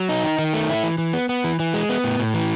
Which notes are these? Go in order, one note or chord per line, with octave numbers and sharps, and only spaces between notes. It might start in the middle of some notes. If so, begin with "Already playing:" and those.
Already playing: F#3
D#4
D#3
D#3
A3
E4
E3
E3
B3
B3
E3
E3
G#3
B3
A2
A2
E3